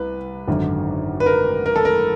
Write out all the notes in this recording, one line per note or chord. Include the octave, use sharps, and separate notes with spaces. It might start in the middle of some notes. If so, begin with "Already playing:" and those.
Already playing: C2 B4
G#1 F#2 D3
B4
A#4
A#4
A4
A#4